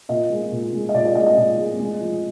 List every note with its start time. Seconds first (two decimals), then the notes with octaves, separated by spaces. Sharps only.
0.09 A#2 D#5
0.30 G#3
0.52 A#2
0.73 G#3
0.89 D#5
0.94 A#2 D5
1.05 D5
1.15 G#3 D#5
1.26 D#5
1.37 A#2
1.58 G#3
1.80 G#3
2.00 F3